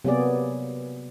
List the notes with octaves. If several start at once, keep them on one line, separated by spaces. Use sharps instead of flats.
C3 F#3 A#3 B3 G#4 D5